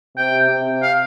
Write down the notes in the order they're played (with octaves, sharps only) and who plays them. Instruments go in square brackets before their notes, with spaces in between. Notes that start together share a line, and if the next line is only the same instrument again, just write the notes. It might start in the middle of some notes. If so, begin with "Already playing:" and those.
[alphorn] C3 [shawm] G5
[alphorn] C3
[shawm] F5